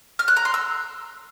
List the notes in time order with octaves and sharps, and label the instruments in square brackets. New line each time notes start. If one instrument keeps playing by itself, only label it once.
[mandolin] F6
F#6
A#5
C6
E6